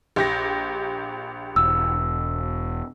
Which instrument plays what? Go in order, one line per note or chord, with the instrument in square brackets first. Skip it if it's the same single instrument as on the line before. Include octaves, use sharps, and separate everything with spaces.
[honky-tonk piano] A#1 G4 A#6
[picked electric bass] E1 [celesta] E6